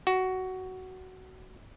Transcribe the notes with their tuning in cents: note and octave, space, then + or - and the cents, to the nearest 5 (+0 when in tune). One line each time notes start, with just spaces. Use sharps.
F#4 +10